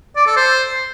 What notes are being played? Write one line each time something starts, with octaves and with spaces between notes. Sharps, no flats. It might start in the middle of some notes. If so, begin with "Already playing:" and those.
D5
A4
C5